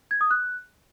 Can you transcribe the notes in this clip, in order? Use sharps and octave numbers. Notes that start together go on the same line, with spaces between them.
G#6
D#6
F#6